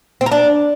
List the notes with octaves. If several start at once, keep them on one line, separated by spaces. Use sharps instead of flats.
C4
A#4
D4